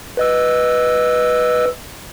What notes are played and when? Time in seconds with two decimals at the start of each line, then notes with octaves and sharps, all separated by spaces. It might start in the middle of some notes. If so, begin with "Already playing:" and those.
0.17 B4 D#5 E6